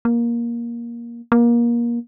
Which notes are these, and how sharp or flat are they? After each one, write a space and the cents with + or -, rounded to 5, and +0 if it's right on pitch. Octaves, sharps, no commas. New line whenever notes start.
A#3 +15
A#3 +25